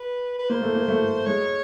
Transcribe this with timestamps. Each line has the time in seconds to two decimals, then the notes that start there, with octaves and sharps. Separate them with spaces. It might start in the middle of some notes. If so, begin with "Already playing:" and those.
Already playing: B4
0.39 B4
0.49 A#3 C5
0.62 A3
0.75 A#3
0.88 A3
1.26 G#3 C#5